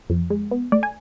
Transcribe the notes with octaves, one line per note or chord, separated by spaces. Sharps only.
F2
G#3
B3
A3 D5
G#5